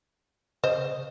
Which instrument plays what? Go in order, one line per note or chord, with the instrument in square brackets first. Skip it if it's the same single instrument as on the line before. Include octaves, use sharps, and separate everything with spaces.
[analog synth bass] C#3 [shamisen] C5 D#5